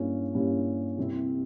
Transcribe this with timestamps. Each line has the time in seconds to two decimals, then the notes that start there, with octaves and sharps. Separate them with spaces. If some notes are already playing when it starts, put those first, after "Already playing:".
Already playing: G2 G3 A#3 C#4 E4
0.35 G2 G3 A#3 C#4 E4
0.97 C2 C3 G3 C4 E4